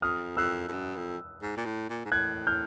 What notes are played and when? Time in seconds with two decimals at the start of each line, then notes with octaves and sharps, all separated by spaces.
0.02 F2 D#6 F6
0.37 F2 E6 F#6
0.68 F2
0.73 F#2
0.96 F2
1.42 G#2
1.57 A#2
1.65 A2
1.89 A#2
2.05 G#2
2.11 A2 F#6 G#6
2.47 F6 G6